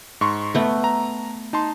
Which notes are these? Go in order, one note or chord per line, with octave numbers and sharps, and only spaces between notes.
G#2 C6 C#6
A3 B3
A#5
D#4 A5 C6